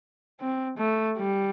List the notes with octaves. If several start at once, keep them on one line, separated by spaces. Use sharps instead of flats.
C4
A3
G3